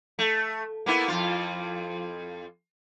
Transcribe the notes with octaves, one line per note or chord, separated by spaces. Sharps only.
A3
A#3 B3 E4
F2 F4